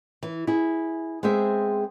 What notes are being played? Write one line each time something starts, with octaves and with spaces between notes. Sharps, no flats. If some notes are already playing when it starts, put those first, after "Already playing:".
E3
E4 G#4
G#3 B3 C4 G#4 C5 E5